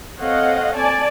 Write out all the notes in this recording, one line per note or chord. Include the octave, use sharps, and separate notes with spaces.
C4 A4 C#5 D#5 F5 F#5
D5 G#5 A5